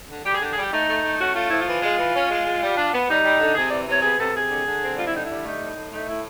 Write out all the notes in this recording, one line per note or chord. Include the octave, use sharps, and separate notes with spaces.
D3
G3 G4
G#4
D3 G4
G#4
G3 G4
A3 D#4
A3
A3
C#4 F#4
A3 F4
F3 E4
F4
E3
G#3
E3
C#4
G#3
G#3
G3
D4
B3
G3 D#4
G3
D3
C3 G#4
E3 D5
C3 C#5
B3 G#4
C3 A4
C3 G#4
D3
D3
C4
G3 F4
E4
D3 D#4
G3 E4
A3 D#4
A2
A2
A3 D#4
A2 E4